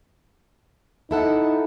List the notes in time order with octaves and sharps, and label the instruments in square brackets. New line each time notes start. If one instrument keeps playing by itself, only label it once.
[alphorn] D#4 [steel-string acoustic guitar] E4 A4 F#5